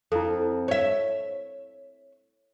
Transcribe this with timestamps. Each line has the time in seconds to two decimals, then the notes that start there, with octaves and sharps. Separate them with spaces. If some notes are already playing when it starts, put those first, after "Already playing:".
0.12 F2 E4 A4
0.68 C#5 E5